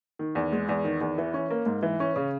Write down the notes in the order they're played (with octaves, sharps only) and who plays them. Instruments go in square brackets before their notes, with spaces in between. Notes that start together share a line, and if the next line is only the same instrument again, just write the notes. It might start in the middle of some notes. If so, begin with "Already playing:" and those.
[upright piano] D#3
E2
G#3
E2
D#3
E2
E3
C#4
A#3
G#2
E3
C#4
C#3